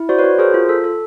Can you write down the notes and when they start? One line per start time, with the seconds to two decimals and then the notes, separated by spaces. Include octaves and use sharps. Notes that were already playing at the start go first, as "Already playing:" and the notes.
Already playing: E4
0.09 F#4 C5 D5
0.18 B4 C#5
0.24 F#4
0.39 G#4 A#4 C5
0.54 F4
0.69 A4
0.84 A4